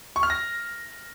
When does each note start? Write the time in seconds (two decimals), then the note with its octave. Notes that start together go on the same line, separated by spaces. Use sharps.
0.16 C#6
0.23 F6
0.30 A#6